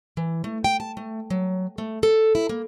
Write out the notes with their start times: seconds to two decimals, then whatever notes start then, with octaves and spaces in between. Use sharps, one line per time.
0.17 E3
0.44 A3
0.64 G5
0.80 A5
0.97 A3
1.30 F#3
1.78 A3
2.03 A4
2.35 E4
2.49 A#3